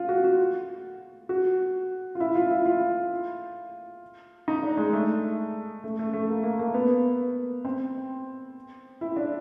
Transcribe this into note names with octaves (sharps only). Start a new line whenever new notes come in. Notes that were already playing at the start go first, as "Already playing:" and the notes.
Already playing: F4
F#4
F#4
F#4
F4
E4
F4
E4
F4
D#4
D4
G#3
A3
A3
A3
A3
A#3
A#3
A#3
B3
C4
E4
D4